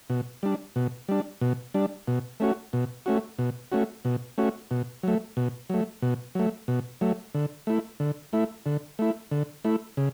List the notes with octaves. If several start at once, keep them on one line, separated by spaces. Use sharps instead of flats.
B2
G3 D4
B2
G3 D4
B2
G3 D4
B2
A3 C#4 F#4
B2
A3 C#4 F#4
B2
A3 C#4 F#4
B2
A3 C#4 F#4
B2
F#3 A3
B2
F#3 A3
B2
F#3 A3
B2
F#3 A3
D3
A3 E4
D3
A3 E4
D3
A3 E4
D3
A3 E4
C#3